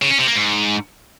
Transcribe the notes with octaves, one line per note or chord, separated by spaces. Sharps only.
C#3
C#4
C3
A#3
G#2